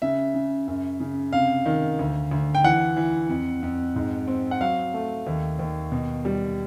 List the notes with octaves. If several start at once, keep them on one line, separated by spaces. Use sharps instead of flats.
C#3 E5
C#3
F#2
C#3
C3 F5
D#3
D2
D2
G5
E3 F#5
E3
F2
F2
G#2
C4
F#5
F#3 F5
A3
D#2
D#2
B2
G3